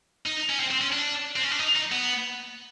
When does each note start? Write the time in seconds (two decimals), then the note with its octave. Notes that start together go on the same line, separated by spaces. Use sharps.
0.26 D#4
0.50 C#4
0.60 C4
0.71 C4
0.81 C#4
0.92 D4
1.36 C4
1.43 C#4
1.51 D4
1.59 D#4
1.76 D#4
1.92 B3